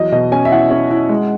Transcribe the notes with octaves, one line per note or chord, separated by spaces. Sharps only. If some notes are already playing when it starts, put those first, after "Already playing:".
Already playing: E2 F#3 D#5
B2 D#5
C#4 G#5
E5
E4 F#5
C#4
E4
G#3